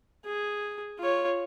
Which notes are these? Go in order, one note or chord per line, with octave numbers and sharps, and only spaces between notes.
G#4
F4 C#5